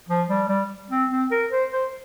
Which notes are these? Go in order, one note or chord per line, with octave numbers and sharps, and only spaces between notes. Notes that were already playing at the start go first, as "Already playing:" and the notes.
F3
G3
G3
C4
C4
A#4
C5
C5